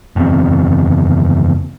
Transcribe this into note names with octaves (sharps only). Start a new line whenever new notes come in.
F#1 E2 C4